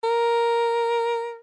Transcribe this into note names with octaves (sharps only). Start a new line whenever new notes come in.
A#4